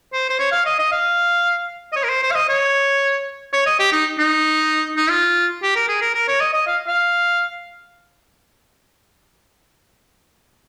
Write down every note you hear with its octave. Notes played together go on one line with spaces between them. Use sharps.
C5
C5
C#5
F5
D#5
D#5
F5
D#5
C#5
A#4
C5
C5
F5
D#5
C#5
C#5
D#5
G4
D#4
D#4
D#4
F4
G4
A#4
G#4
A#4
A#4
C#5
D#5
D#5
F5
F5